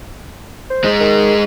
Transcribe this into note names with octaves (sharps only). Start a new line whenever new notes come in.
C5
G#3 D#4
D#3